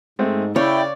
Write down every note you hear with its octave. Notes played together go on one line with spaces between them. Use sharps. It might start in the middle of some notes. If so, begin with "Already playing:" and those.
G#2 G#3 A3 C4
C#3 E4 C#5 D5 G5